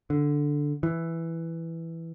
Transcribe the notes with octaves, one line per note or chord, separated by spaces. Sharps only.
D3
E3